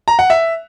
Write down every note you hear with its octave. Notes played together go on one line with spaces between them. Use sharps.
A#5
F#5
E5